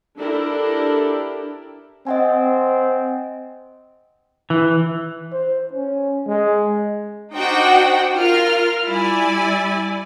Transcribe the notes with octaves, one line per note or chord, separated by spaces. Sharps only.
D4 E4 G4 A4 A#4
C4 D#5 F#5 G#5
E3
C5
C#4
G#3
D4 D#4 F#4 C5 F#5 G5
F4 A#4 F6
G3 E4 D5 G#5